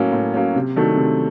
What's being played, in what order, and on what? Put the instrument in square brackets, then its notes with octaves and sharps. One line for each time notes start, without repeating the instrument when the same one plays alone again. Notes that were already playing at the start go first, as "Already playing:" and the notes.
Already playing: [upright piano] A2 F#3 A#3 C#4
A2
F#3 A#3 C#4
C3
D#3 F#3 A3 D4
C3